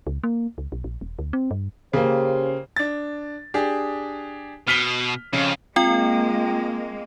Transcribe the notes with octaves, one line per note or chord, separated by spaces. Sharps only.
C#2
A#3
C#2
B1
A#1
E1
D2
C4
G2
C#3 A#3 C#4 G4 C5
D4 A6
D4 G4 G#4
B2 F6 B6 G7
F2 C#3
G#3 A#3 C4 F4 G5